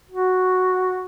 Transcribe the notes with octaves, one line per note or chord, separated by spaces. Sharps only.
F#4